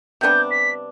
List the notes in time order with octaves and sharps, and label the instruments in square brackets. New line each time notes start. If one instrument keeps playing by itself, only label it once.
[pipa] C3 G3 B3 D4 [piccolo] G6
[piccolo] B6